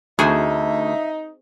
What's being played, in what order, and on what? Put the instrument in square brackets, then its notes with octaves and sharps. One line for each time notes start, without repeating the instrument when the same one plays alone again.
[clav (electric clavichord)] D2 [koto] C4 F#4 G#4 [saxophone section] D#4 [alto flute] E5